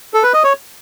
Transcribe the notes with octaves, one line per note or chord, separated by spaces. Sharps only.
A4
B4
D#5
C#5